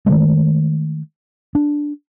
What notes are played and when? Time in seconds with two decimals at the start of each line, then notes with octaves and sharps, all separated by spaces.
0.06 D#3 F3 G#3 A3
1.55 D4